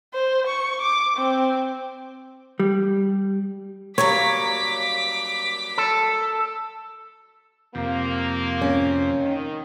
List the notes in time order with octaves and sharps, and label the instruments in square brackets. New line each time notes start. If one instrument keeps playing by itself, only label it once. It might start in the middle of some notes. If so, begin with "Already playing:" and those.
[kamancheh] C5
C#6
D6
C4
[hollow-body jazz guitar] G3
[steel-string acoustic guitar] F#3 G3 A#3 [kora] C#5 [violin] D6 B6
[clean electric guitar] A4
[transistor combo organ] F2 C3 [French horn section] A#3
[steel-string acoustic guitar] C#4
[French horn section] D#3